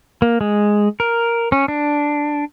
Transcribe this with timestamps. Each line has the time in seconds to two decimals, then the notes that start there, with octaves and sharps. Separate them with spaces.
0.22 A#3
0.41 G#3
1.00 A#4
1.52 C#4
1.68 D4